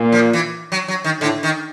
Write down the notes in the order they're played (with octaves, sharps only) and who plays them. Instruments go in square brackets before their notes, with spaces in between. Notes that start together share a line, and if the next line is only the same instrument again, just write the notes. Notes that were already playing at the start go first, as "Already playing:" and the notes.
Already playing: [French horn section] A#2
[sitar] F3
E3
F#3
F#3
D#3
[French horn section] A2 [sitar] D3
[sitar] D#3